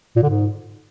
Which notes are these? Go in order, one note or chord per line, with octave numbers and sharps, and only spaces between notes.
A#2
D3
G#2